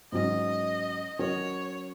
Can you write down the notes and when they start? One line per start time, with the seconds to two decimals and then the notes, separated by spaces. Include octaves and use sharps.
0.12 G#2 F#3 C#4 D#5
1.19 F#3 C#4 F#4 A#4 C#5